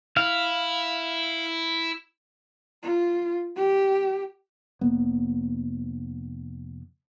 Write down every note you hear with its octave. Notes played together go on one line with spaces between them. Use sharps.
E4 F5
F4
G4
F1 A#3 B3